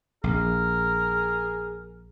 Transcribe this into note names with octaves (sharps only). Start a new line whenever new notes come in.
A#1 G#4 A#4